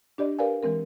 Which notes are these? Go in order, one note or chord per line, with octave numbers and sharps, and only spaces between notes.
D4 G4 D5 D#5
G4 A#4 B4 D5 F5 G#5
E3 G#3 C4 A#4